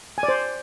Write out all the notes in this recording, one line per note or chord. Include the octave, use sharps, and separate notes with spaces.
G#5
D5
C5